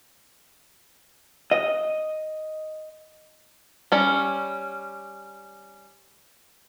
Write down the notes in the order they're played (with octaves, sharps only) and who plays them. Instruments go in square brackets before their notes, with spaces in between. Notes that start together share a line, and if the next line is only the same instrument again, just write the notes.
[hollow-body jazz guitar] D#5
[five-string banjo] G3 C#4